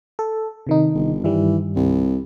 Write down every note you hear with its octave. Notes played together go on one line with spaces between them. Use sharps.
A4
C3 D#3 D#4
G1
G2 D#3 E3 G3
C2